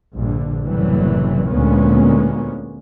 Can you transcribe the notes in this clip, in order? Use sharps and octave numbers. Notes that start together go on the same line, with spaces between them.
A#1 G2 D3
F#1 A2 C3 E3 F#3 G3
D2 A#2 G#3 A#3 B3 C#4